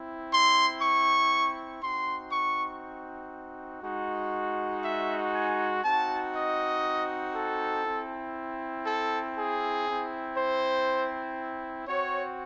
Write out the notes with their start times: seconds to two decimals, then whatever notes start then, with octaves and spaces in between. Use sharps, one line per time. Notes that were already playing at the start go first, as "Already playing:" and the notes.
Already playing: C4 E4
0.32 C6
0.82 C#6
1.82 C4 D#4 F#4 C6
2.32 C#6
3.83 G#3 D#4 F#4
4.84 E5
5.34 G#5
5.84 C4 D#4 F#4 A5
6.35 D#5
7.35 A4
7.85 C4 E4
8.86 A4
9.36 G#4
9.86 C4 E4
10.37 C5
11.87 C4 F#4 C#5